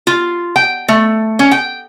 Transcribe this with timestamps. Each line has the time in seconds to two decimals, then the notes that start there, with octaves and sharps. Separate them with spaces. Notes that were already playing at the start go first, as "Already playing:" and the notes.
0.07 F4
0.56 G5
0.88 A3
1.39 C#4
1.51 G5